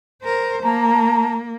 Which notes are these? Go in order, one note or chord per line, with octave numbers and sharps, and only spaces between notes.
A#4 C5
A#3 A5 A#5